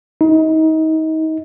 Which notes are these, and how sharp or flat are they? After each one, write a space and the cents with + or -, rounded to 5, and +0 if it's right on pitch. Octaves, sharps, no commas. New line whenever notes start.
D#4 +30